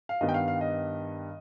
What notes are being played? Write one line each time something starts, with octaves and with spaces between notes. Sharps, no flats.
F5
G2 D#3 G3 B3 D#5
G5
F5
F5
D#5